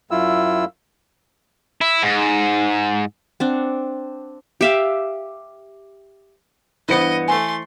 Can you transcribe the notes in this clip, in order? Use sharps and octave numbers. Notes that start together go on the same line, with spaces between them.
F#2 E4 F4 E6
E4
G#2
C4 D4 F#5
G4 E5 F5
G2 E3 B3 C5 D#5 C#7
A3 G#5 C6